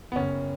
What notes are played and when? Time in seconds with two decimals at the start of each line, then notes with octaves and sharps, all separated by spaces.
0.12 B3
0.16 F#1 C#4